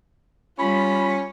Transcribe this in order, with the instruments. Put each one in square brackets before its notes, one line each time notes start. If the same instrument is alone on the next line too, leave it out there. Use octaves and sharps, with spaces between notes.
[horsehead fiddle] G3 F4 [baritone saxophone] C#4 [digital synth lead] B5